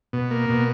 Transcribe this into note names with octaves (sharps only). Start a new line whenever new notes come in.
B2
A#3
B2